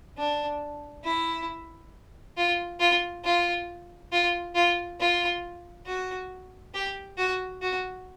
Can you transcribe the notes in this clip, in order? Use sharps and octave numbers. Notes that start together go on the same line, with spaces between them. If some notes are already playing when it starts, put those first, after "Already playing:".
D4
E4
F4
F4
F4
F4
F4
F4
F#4
G4
F#4
F#4